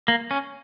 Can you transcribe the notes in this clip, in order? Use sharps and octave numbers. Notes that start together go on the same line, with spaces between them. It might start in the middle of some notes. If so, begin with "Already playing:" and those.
A#3
C#4